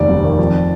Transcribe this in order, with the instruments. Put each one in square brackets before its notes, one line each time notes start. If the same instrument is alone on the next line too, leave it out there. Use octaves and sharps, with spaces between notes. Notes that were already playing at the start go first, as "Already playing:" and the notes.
Already playing: [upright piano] F1 D#2 [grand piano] D5
[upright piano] G3
D#3
F2